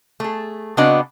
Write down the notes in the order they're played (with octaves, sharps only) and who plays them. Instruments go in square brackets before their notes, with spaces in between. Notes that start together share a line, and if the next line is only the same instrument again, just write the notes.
[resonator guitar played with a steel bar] A3 G#4
C#3 B3 C4 D4 F#4 D#5